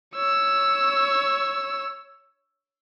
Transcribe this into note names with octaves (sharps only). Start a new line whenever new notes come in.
C#5 E6